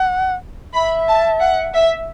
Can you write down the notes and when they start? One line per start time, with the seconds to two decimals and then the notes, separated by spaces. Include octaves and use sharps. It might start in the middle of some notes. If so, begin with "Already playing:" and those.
Already playing: F#5
0.74 E5 B5
1.08 A5
1.41 F#5
1.74 E5